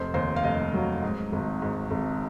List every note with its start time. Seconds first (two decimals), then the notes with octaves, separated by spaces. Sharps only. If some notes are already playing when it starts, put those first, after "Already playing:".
Already playing: F1 C5
0.14 D#2 C5
0.36 F5
0.43 F1 D#5
0.74 F#3
1.02 G#2
1.32 G#1
1.62 G#2
1.91 G#1